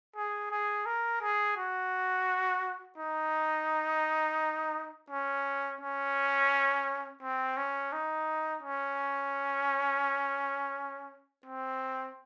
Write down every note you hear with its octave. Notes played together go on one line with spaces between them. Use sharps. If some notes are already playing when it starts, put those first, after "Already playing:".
G#4
G#4
A#4
G#4
F#4
D#4
C#4
C#4
C4
C#4
D#4
C#4
C4